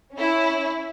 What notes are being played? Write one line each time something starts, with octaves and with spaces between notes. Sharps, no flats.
C#4 E4